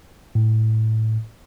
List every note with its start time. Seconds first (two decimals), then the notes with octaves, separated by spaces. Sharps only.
0.35 A2